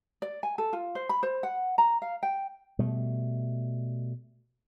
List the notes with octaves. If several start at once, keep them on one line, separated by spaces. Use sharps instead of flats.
D5
G#5
A4
F4
C5
B5
C5
F#5
A#5
F5
G5
B2 G3 A3